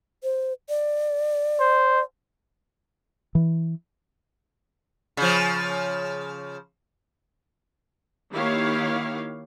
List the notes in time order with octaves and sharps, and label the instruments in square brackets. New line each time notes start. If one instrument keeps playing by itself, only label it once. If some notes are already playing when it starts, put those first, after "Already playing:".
[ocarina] C5
D5
[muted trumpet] C5
[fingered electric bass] E3
[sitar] C#3 F3
[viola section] D#3 A#3 E4 G4 C#5 F5